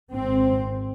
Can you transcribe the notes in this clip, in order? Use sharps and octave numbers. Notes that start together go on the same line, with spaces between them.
G#1 G#2 C4